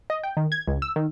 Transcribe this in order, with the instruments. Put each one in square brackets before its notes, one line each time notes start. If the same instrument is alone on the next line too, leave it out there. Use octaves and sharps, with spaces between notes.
[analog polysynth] D#5
G5
D#3
G#6
C#2
E6
D#3